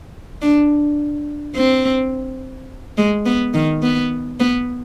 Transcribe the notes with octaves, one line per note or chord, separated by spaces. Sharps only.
D4
C4
G#3
B3
D#3
B3
B3